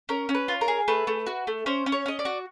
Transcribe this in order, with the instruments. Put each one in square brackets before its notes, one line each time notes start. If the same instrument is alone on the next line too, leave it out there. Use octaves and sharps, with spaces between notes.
[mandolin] C#4 A#4
C#4
B4
F4
A#4
G#4
A3 B4
A3
F#4
A3
C#4 C5
C#4
C#5
C#4 D#5
D5
F#4